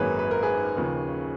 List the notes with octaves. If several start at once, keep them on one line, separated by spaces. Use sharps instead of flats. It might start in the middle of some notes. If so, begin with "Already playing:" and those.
Already playing: G#1 F#2 D#3 F#3 A#3 C#4 G#4 B4
B4
A#4
G#4 B4
D#2 C#3 F3